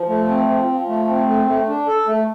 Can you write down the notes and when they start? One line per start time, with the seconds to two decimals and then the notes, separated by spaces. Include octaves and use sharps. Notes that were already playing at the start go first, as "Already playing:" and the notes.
Already playing: F3
0.09 A3
0.29 C4
0.48 F3
0.68 F3
0.88 A3
1.08 C4
1.28 A3
1.47 A3
1.67 D4
1.87 A4
2.07 A3